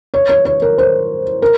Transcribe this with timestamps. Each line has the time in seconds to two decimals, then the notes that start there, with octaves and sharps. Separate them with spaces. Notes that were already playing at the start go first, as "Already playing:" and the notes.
0.14 C#5
0.29 C#5
0.45 C#5
0.62 A#4
0.78 C5
1.42 A#4